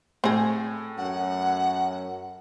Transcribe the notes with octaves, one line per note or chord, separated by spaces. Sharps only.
A2 C4 G#4
F#2 F#5